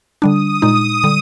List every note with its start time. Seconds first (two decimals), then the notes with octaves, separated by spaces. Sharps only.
0.21 D3 G3 D4 D#6
0.62 A#2 G#3 D#4 D#6
1.04 D3 G3